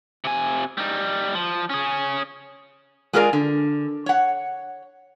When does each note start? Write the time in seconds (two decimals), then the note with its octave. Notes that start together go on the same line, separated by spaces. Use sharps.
0.25 C3 G#5
0.78 G3 D#4
1.34 F3
1.70 C#4 G#4
3.13 G#3 F4 G#4 A#4 D5
3.33 D3
4.06 C#5 F#5